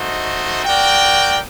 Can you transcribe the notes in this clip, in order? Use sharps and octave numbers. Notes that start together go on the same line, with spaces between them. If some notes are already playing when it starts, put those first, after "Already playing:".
Already playing: A3 D#4 F#4 C5 D#5
F#4 A#4 D5 G5